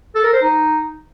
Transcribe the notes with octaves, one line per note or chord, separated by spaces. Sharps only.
A4
A#4
C5
D#4